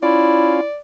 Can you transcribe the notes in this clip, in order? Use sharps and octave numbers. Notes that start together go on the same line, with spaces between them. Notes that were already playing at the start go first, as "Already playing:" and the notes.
C#4 E4 F4 D5